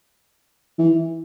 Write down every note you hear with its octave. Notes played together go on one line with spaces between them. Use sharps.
E3